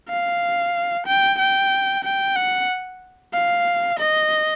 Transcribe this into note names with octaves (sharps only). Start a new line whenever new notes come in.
F5
G5
G5
G5
F#5
F5
D#5